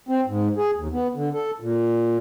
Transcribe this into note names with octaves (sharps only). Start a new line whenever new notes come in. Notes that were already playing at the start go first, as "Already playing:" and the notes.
C4
G#2
G#4
D#2
B3
D3
A4
A#2